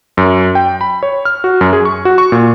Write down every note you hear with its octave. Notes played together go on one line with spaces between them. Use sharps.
F#2
G5
B5
C#5
F6
F#4
F#2
G#4
C#6
F#4
C#6
A#2